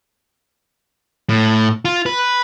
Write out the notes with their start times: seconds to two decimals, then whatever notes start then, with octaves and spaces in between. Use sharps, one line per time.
1.29 A2
1.85 F4
2.06 B4